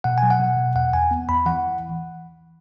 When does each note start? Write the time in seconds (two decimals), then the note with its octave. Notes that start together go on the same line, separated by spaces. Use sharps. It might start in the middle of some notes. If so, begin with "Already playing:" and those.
0.04 B2 F#5
0.18 G#5
0.23 F#3
0.31 F#5
0.40 B2
0.57 B2
0.75 E2 F#5
0.93 E2 G#5
1.11 B3
1.28 E2 B5
1.46 E3 F#5